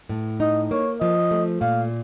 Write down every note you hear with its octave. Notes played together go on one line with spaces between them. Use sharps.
A2
D#4 D#5
A#3 C#5
F3 D#5
A3
A#2 F5